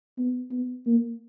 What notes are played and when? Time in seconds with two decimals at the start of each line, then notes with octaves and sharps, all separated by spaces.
0.18 B3
0.51 B3
0.86 A#3